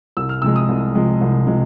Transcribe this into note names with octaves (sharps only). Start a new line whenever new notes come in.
C2 E6
F6
C3 F3 G#3 E6
D#6
C2
C3 F3 G#3
C2
C3 F3 G#3